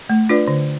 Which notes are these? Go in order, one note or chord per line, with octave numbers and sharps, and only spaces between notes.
A3
D4 F4 B4 D5
D3